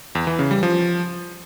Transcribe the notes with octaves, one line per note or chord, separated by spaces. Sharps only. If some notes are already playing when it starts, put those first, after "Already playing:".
E2
E3
C#3
G3
F3